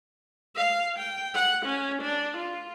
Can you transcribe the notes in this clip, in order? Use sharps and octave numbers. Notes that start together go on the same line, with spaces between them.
F5
G5
F#5
C#4
D4
F4